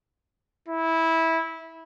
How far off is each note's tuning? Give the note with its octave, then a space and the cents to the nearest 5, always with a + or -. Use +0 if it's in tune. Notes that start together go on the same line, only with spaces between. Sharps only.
E4 -15